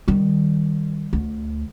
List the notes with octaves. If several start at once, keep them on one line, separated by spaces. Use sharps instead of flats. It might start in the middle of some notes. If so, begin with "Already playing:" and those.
D#3 G3
D2